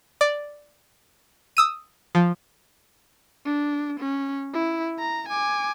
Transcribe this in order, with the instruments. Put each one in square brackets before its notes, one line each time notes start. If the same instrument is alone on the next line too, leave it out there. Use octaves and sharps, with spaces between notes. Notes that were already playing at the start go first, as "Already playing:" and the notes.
[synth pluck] D5
D#6 E6 D#7
F3
[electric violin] D4
C#4
E4
A#5
G#5 D6